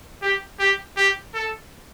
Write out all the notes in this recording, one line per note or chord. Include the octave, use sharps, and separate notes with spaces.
G4
G4
G4
A4